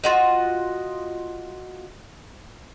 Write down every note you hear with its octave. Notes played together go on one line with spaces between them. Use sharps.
F4 F#4 D#5